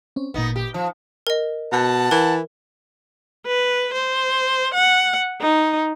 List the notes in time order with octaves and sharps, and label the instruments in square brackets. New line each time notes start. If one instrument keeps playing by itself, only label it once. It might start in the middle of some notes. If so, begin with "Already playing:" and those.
[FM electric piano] C4 C#4
[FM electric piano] G#1 A#2 [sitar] B3 D#4
[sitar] G4
[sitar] F3 [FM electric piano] A5
[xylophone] A#4 D#5
[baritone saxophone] B2 [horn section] F#5 A5
[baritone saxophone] E3 [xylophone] A#4
[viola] B4
C5
F#5
D#4